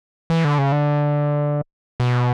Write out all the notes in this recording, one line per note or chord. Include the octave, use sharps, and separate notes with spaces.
E3
D3
C#3
D3
B2